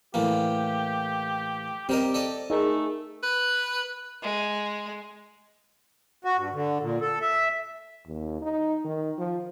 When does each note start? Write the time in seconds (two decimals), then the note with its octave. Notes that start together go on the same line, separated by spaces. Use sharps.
0.14 A2 E3 A#3 G4
1.89 G3 C4 G4 A#4 D#5
2.14 A4 D5 D#5
2.50 A3 D#4 G#4 A#4
3.23 B4
4.22 G#3
6.24 F#4
6.37 G2
6.54 D3
6.82 A#2
7.01 A4
7.21 E5
8.07 D#2
8.42 D#4
8.85 D#3
9.18 F3